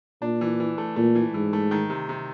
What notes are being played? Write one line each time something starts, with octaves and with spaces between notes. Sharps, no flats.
A#2 D4
E3
E3
A3
A#2 A3
E3
G#2 E3
A3
D#3
C3
C3